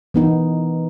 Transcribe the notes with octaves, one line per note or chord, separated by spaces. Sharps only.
E3 B3 D#4